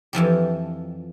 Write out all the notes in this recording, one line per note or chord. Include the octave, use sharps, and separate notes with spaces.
F2 E3 F3 G4